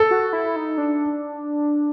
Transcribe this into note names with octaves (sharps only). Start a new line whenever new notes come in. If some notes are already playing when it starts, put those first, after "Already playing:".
Already playing: A4
F#4
E4
D#4
D4